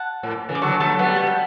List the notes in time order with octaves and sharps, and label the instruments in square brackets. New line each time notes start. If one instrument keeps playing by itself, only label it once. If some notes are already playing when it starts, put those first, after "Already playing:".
Already playing: [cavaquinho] F#5 A5
[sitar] A2
C#3 E3
[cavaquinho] D6
[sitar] D3 F#3 [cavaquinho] A5 C#6
[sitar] F#3 A3 [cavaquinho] A5 C#6
[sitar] G3 B3 [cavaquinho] F#5 A5
[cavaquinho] A5
G5